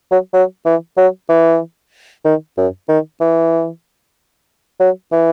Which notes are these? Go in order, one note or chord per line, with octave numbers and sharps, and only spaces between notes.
F#3
F#3
E3
F#3
E3
D#3
F#2
D#3
E3
F#3
E3